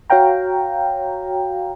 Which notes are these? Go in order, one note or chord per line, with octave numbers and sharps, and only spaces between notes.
F#4 C#5 F5 G5 A#5